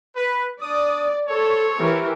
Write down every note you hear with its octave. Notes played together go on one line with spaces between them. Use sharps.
B4
D4 D5 D#6
A4 C5 C#5
E3 G4 A#4